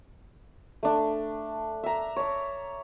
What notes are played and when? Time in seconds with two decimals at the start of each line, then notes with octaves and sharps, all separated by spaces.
0.83 A3 D4
1.83 E5 A#5
2.16 C#5 D5